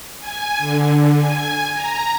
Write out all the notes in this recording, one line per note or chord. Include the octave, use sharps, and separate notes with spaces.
G#5
D3
G#5
A#5